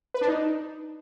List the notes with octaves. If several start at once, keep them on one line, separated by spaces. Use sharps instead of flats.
B4
D4
D#4